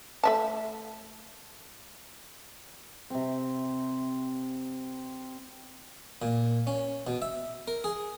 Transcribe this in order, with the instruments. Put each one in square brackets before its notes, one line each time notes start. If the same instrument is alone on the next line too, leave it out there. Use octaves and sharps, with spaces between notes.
[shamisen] A3 E5 A5
[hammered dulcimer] C3 C4
[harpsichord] A#2
C#4
B2
E5
A#4
G#4